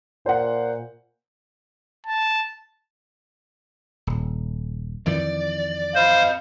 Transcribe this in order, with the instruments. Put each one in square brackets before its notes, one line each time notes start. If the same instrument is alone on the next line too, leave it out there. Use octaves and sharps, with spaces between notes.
[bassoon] A#2 [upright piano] C5 F#5
[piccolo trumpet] A5
[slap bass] D#1
[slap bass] F2 D#3 E3 [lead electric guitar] D5
[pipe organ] C5 [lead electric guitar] D#5 B5 [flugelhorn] F5